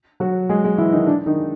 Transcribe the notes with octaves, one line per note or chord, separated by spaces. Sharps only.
F#3 F#4
G#3 G#4
G#3 G#4
E3 E4
D#3 D#4
D4
D#3 D#4